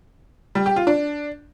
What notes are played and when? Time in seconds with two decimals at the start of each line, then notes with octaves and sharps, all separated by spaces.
0.55 G3
0.66 G4
0.76 F4
0.87 D4